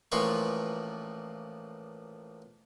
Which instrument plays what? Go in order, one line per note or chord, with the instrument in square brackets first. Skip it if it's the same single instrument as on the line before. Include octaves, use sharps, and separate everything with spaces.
[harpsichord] A1 A#2 F3 F4 B4 C#6